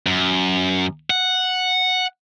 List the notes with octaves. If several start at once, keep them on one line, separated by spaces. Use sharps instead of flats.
F#2
F#5